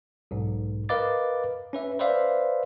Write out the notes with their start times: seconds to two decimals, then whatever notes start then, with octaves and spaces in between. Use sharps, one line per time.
0.31 B1 G#2
0.89 A#4 B4 D#5 F5 D6 A6
1.73 C#4 B4 E5
1.99 B4 C5 D5 E5 F5